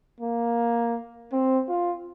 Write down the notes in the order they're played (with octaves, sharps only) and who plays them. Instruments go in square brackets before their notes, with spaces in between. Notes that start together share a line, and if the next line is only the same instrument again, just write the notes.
[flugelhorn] A#3
C4
F4